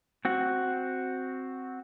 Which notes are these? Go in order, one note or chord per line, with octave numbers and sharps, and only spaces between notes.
C4 F#4